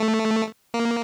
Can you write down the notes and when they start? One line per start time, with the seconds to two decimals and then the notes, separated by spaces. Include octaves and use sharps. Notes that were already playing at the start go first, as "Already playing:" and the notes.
Already playing: A3
0.74 A#3